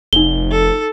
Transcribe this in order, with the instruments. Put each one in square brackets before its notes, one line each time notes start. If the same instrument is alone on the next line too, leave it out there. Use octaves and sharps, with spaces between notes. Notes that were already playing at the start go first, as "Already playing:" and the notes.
[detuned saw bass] F1 [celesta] D#4 G7
[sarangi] A4